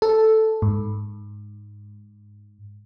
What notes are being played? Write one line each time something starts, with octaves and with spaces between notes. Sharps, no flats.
A4
G#2